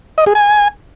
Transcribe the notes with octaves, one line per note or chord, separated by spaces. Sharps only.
D#5
G#4
G#5